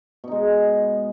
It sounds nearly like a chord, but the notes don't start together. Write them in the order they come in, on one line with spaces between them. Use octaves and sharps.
B2 D#4 G#3